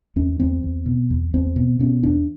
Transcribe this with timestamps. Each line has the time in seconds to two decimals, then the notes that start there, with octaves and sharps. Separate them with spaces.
0.16 E2 C#4
0.40 E2 C4
0.63 E2
0.86 B2
1.10 E2
1.34 E2 C4
1.56 B2
1.79 B2 C#4
2.03 E2 D4